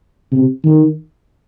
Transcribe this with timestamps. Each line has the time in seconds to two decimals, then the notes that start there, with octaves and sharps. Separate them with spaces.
0.32 C3
0.64 D#3